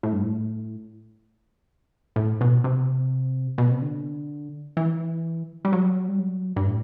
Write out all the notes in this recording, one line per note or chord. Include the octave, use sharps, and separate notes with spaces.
A2
G2
A2
A2
B2
C3
B2
C3
D3
E3
G3
F#3
G3
F#3
G2
A2